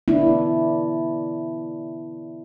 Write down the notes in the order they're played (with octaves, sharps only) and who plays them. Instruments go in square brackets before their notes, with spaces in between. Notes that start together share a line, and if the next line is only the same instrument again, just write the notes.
[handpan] B3 D4 E4